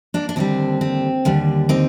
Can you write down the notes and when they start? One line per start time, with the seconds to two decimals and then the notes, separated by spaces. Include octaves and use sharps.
0.14 A#3 D4
0.29 D4
0.36 D#2 D3 G3 C4
0.81 C4
1.25 D#2 D3 G3
1.69 C4 D#4